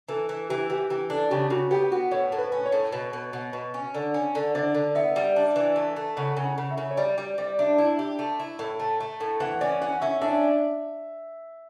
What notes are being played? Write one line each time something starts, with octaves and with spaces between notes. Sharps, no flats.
E3 A4
E3
E3 G4
E3 G4
E3 G4
D4 A4
C#3 G4
C#3 F#4
B3 G4
B3 F#4
A2 C#5
A2
B4
C#4
C#5
A2
B2
B2
B2
B2
C#4
D3
C#4
D3
D3 D5
D3
B3 E5
G3
D4
E3
A3
A3
C#3 F#5
C#3
F#5
C#3
E5
C#3
C#5
G3 D5
G3
G3 D5
D4 E5
E4
G4
A3
E4
A2
A3
A3
A2
E3 F#5
C#4 D5
C#4 F#5
C#4 E5
D4 E5